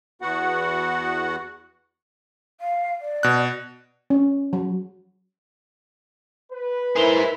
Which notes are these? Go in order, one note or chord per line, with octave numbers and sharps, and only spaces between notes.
E2 B3 F#4 F#5
F5
D5
B2 F#6
C#4
F#3
B4
E4 G#4 A#4 C5 F7 G7